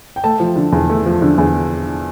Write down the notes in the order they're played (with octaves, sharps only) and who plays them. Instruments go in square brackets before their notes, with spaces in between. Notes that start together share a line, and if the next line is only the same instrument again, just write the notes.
[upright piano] G5
A3 A5
F3
D3
E2
A3
F3
D3
E2